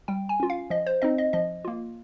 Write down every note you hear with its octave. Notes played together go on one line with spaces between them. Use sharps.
G3 G5
G#5
C#4 F4
F5
F3 D#5
C5
C4 D#4 D#5
D#5
F3 D#5
A#3 F4